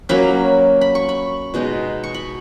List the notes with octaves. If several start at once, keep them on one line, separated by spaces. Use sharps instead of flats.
F#3 A#3 C#4 B5
B5
C#6
B5
B2 G#3 D#4
C#6
B5